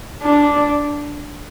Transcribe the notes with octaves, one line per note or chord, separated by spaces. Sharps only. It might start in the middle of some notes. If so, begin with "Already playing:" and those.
D4